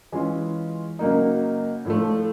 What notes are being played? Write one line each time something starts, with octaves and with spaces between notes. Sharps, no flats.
E3 G#3 C#4 F4
C#3 F#3 A#3 D#4
A2 F3 A3